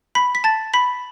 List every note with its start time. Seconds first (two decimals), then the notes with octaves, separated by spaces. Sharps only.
0.15 B5 B6
0.35 B6
0.44 A5 A6
0.74 B5 B6